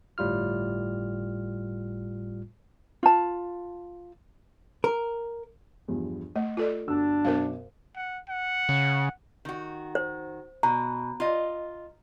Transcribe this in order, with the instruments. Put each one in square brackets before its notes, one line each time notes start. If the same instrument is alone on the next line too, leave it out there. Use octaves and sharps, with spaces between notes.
[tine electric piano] G1 A2 G3 F4 F6
[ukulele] F4 A5
[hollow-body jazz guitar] A#4
[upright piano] E2 G2 F3
[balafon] A3 [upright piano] D#5
[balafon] F4 A4 D5
[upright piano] G1 F#4 E6 [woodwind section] D4
[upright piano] F#2 B2 [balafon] A#4 C5 F5
[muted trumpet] F#5
F#5
[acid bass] C#3
[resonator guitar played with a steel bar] D#3 F#4
[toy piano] C5
[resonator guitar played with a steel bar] B2 [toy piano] A#5
[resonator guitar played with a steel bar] F4 D#5